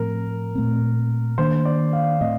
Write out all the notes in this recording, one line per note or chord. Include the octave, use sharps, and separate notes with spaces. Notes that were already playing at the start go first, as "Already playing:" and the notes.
Already playing: A2 F3 A3 C4 A#4
A#2 A3 C4
D#3 A#3 D4 C5
D5
F5
A2 A3 C4 D#5